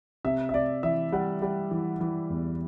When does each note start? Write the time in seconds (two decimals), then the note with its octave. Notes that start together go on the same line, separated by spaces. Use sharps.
0.25 C3 E5
0.49 E5
0.54 C3 D5
0.83 E3 E5
1.12 G3 F#5
1.42 G3
1.71 E3
2.00 E3
2.30 E2